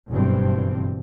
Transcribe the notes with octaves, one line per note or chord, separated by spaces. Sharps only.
F#1 B1 G2 E3 C4